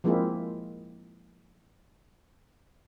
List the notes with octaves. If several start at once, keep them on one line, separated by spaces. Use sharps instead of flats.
F3 G#3 A#3 C4 E4